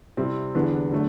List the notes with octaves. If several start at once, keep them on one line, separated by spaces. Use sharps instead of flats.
C3 G3 C4 E4
E2 D3 G3 B3 D4
D3 F#3 A3